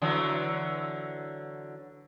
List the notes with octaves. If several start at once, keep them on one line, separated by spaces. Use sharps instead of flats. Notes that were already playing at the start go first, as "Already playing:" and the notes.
D3 E3 F#3